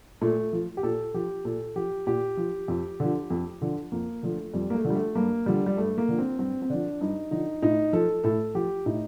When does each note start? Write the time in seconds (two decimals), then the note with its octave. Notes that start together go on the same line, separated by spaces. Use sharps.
0.21 A#2 A3
0.53 F3
0.77 G4
0.83 A#2 A4
1.14 F3 G4
1.45 A#2 A4
1.76 F3 G4
2.07 A#2 G4
2.37 F3
2.68 F2
3.00 D3 F3
3.30 F2
3.61 D3 F3
3.92 F2 A#3
4.23 D3 F3 A3
4.53 F2 G3
4.70 A#3
4.75 A3
4.85 D3 F3
4.90 G3
4.95 A3
5.15 G2 A#3
5.46 D3 F3 G3
5.66 G3
5.77 G2 A3
5.98 A#3
6.08 D3 F3
6.19 C4
6.39 G2 C4
6.62 C4
6.70 D3 F3 D4
7.01 G2 D#4
7.31 D3 F3 D#4
7.62 A2 D#4
7.93 F3 A4
8.24 A2 A4
8.55 F3 G4
8.86 A2 D#4